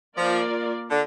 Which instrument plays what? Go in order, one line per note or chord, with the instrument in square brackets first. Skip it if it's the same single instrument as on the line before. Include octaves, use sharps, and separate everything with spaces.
[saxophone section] F3 [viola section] A#3 F4 A#4 D5
[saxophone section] D3